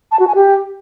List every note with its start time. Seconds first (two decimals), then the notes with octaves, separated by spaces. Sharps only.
0.12 A5
0.19 F#4
0.27 G#5
0.35 G4